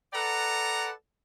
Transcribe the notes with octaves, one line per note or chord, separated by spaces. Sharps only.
A4 B4 D5 F#5 A#5